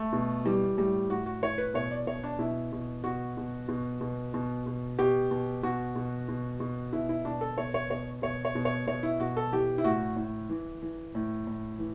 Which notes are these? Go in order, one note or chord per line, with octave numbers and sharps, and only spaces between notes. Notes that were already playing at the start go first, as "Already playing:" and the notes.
Already playing: A3
B2
E3 G3
A2 G3
A2 F#4
F#4
E3 C#5
B4
B2 C#5
D5
B2 C#5
D4
B2 E4
B2
B2 F#4
B2
B2
B2
B2
B2
B2 G4
B2
B2 F#4
B2
B2
B2
B2 E4
E4
B2 D4
A4
B2 C#5
C#5
B2 C#5
B2 C#5
C#5
B2
C#5
B2 C#5
E4
B2 F#4
A4
E3 G4
E4
A2 F#4
A2
E3
E3
A2
A2
E3